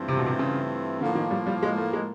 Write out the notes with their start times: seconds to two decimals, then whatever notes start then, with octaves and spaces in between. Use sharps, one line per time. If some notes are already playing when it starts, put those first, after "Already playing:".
Already playing: G2 E3 A3 C4 F4
0.08 C3
0.17 B2
0.27 C3
0.39 C#3
1.00 A2 D3 F3 A#3
1.15 D#3
1.31 G3
1.47 G3
1.63 G#3
1.78 A3
1.93 G#3